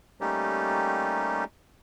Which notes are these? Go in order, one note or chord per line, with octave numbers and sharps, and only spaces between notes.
G3 A3 A#3 C#4 D#4 G4